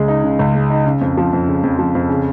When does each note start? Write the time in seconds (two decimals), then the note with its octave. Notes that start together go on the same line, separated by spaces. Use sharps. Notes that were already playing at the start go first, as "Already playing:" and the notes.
Already playing: C#2 C#3 G#3
0.08 D#4
0.23 C#3
0.39 C#2
0.55 G#3
0.70 D#4
0.86 C#3
1.01 F2
1.17 F3
1.33 F2
1.47 C#3
1.63 F2
1.79 F3
1.95 F2
2.09 C#3